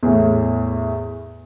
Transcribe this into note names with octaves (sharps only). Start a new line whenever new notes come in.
E2 A2